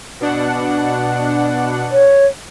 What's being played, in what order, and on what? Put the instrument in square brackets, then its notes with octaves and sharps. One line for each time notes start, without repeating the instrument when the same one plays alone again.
[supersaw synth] B2 D4 F#5
[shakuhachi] C#5